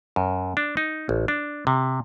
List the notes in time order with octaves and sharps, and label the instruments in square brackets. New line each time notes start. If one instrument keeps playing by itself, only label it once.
[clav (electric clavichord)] F#2
D4
D#4
A1
D4
C3